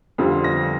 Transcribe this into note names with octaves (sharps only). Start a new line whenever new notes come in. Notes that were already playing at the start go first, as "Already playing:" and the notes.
F2 D3 G3 C4 F4
A#6